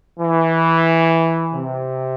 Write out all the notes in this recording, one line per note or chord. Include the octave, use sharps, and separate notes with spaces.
E3
C3